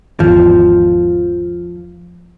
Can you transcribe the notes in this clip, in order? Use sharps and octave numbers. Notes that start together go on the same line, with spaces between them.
G#1 E2 F3